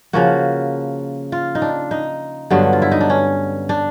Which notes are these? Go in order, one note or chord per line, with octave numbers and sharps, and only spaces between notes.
C#3 F3 A#3 F#4
F4
D#4
D4
D#4
G2 D3 F#3 B3
F4
E4
D#4
D4
C#4
D4